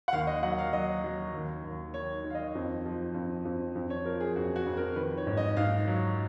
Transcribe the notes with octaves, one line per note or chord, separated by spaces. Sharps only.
F#5
D#2 F5
D#5
F#3 F#5
F5
F#3 D#5
F#3
D#2
D#2
D#3 C#5
D#3
F5
D#5
F2
F3
F2
F2
F2
C#5
F3 A#4
G#4
F2 F#4
F#4
F2
A#4
D#3 B4
C#5
G#2
D#5
G#2 F5
F#3